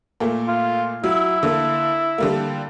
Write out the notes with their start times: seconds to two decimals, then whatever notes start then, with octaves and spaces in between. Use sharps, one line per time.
0.20 A#2 A3 A#3
0.48 F4
1.04 F#3 E4
1.43 D3 A#3
2.18 D3 G3 A#3